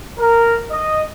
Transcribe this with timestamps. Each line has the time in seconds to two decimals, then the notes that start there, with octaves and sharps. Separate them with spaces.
0.19 A#4
0.70 D#5